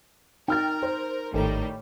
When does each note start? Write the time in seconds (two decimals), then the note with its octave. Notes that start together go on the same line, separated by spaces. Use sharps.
0.48 D#4 A#4 G5 F6 A6
0.83 C5
1.34 G#1 A2 D#3 G3 A4 A#5